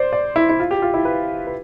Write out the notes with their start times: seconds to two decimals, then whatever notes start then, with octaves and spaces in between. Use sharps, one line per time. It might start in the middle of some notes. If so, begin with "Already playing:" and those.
Already playing: C5 D5
0.13 D5
0.36 E4
0.49 E4
0.60 F4
0.71 G4
0.82 F4
0.94 E4
1.05 B4
1.47 B4